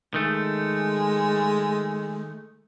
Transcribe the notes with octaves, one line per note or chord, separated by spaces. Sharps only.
D#3 G#3 A3